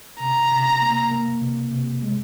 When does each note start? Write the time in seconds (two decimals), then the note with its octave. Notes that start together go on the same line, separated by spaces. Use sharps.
0.20 C3 A#5
0.51 C3
0.82 A#3
1.11 A#3
1.42 C3
1.71 C3
2.02 G#3